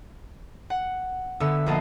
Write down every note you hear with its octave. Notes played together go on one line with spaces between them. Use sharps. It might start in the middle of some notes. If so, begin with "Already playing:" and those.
F#5
D3 B3 E5 E6 C#7
A#1 A#3 B3 D#5 A5 C7